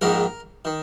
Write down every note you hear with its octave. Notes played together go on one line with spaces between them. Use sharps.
A#1 G#2 D#3 A#4
D#3